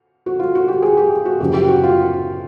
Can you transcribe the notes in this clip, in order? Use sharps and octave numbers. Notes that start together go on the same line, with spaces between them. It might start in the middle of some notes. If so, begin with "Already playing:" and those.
F#4
F4
F#4
G4
G#4
G4
F#4
F#1 F#2 C#3 F3 G4
G4
F#4
F4